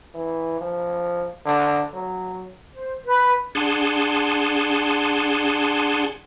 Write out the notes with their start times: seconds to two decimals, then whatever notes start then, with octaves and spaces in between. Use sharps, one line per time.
0.14 E3
0.60 F3
1.46 D3
1.93 F#3
2.73 C5
3.05 B4
3.55 D4 G#4 F#5 G#5 A5 C6